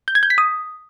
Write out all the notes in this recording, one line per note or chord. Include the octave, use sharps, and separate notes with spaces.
G6
G#6
G6
B6
D#6